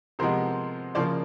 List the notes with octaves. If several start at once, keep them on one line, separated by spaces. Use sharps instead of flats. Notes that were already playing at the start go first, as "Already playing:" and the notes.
C3 F3 G#3 B3 A#4 C5
C#3 F3 A#3 C5 D5